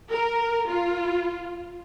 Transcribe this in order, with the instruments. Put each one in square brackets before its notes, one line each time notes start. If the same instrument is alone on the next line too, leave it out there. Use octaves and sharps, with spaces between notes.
[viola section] A#4
F4